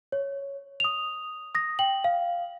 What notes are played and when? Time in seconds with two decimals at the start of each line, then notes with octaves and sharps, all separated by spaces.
0.12 C#5
0.80 D#6 F7
1.55 D#6 A#6
1.79 G5 F#7
2.04 F5